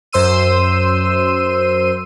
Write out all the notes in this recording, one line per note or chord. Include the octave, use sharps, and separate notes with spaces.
F#2 C5 C6 E6 D#7